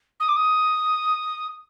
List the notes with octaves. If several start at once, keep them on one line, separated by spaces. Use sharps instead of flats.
D#6
D6
D#6